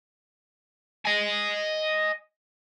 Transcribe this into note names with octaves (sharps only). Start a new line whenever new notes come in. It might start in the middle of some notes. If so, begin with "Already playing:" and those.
D#5 G#5